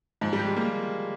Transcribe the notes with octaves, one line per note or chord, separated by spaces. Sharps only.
G#2 F3
G3
G4
G#3
A#3